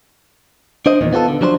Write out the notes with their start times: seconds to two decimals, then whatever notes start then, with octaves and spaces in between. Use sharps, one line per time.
0.86 D4 C5 D#5
1.01 E2 A#2 D#3
1.13 B3 F4 F#4 A4
1.28 D3
1.41 F3 F#3 D4 A4 C5